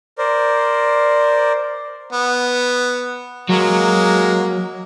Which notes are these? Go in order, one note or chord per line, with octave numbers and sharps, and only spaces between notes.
A#4 C5 D5
B3
F#3 G#3 A#3